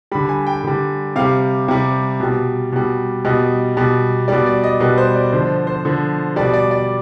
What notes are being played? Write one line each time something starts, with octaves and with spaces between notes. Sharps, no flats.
D3 G3 B5
G#5
G5
D3 G3
C3 G3 F5
C3 G3
B2 G3
B2 G3
B2 G3 D#5
B2 G3
B2 G3 D5
D5
D#5
B2 G3 B4
C5
D5
D3 F3 C5
C5
D3 F3
B2 G3 D5
D5
D5